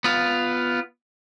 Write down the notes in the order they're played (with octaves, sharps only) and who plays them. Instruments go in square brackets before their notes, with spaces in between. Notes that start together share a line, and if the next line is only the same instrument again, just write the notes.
[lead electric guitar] B3 F4